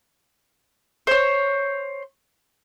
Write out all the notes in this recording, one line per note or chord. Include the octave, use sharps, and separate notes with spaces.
C5 C#5